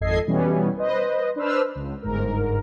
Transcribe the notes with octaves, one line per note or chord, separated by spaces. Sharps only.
G#1 F2 A4 D#5 G#6 C7
B2 E3 G3 B3 C#4
B4 C5 D#5
D4 B4 C5 E6 F6
C#2
G1 G#2 A#4